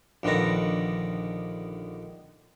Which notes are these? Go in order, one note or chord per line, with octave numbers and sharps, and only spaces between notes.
A#1 D3 D#3 B3 A#5